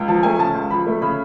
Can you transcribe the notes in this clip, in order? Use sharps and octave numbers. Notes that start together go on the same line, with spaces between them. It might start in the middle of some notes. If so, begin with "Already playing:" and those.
Already playing: C#2
F3 A5
A3 G#5
C#3 A5
C#2
F3 B5
A3
C#3 B5